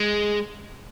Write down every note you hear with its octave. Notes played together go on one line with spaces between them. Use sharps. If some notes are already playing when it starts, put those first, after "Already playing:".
Already playing: G#3